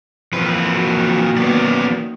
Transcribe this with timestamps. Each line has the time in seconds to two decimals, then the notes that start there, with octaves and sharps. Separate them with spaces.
0.33 A#2 E3 F3 C4 B4
0.71 D#3 A#3 F#4
1.37 E3 F#3 B3 C#4 D5